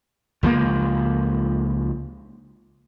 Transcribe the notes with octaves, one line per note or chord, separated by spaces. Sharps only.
C#2 F3 G#3 A#3